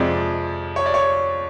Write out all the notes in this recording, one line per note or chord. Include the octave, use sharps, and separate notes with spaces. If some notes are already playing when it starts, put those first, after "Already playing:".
Already playing: F2 C3 F3 G#3 D5
C#5
D5
C#5